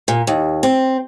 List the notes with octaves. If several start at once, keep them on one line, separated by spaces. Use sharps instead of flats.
A#2
D#2
C4